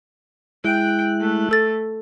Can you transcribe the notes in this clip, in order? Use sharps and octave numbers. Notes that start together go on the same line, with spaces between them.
G#3 E4 G5 F#6
A3
A4 A6